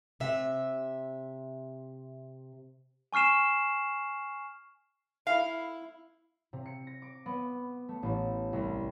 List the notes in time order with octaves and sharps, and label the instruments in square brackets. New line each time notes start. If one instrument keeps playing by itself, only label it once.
[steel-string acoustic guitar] C3 E5
[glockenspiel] G#5 C#6 F6 C7 E7
[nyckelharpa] E4 [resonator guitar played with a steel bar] F5
[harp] C3
C#7
A#6
D6
B3
A3
A1
C2